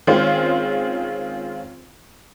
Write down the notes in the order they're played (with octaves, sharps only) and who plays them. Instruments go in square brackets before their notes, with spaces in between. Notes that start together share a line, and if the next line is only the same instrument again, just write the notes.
[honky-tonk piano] D#3 G#3 C4 C#4 F4